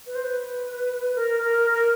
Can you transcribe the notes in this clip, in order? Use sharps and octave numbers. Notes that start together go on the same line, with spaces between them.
B4
C5
B4
A#4
A#4
A#4